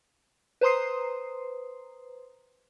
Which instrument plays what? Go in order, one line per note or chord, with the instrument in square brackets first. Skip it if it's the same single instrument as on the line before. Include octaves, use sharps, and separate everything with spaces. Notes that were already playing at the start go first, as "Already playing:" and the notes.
[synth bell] B4 C5 A#5 C6 D#6 C7